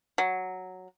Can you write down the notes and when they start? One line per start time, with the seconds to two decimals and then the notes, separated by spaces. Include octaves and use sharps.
0.18 F#3